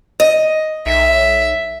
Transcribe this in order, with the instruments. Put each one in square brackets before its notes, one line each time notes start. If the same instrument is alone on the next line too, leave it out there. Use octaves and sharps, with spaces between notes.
[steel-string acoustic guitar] D#5
[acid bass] B1 [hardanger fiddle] E5